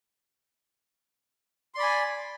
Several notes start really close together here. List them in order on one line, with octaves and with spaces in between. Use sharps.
C6 D5 B5 G#5